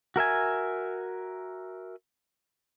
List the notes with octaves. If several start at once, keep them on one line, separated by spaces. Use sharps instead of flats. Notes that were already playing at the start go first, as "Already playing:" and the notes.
F#4 A#4 E5 G#5